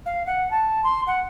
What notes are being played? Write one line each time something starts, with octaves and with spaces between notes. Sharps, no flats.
F5
F#5
A5
C6
F#5